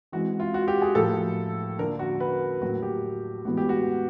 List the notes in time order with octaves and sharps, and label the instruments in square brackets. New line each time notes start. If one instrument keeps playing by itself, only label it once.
[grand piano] E3 G#3 C4 F#4
F4
F#4
G4
G#4
A2 F3 A#3 A4
D3 F3 A#3 A#4
F#4
B4
A2 F#3 A#3 F#4
G4
A2 E3 G#3 B3 F#4
G4
F#4